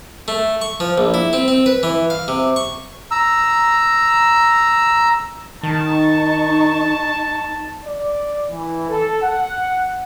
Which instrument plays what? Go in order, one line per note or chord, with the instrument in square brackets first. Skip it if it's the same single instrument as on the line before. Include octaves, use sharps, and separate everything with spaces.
[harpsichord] A3
C#6
F3
A#1
E4
C4
C4
B4
E3
F5
C3
C#6
[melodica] A#5 E6
[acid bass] D#3 [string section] D#4 C#6 [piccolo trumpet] A5
[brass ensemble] D5
E3
A4
F#5